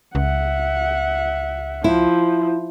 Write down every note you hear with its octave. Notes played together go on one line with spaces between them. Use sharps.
C#2 E5 F#5
F3 E4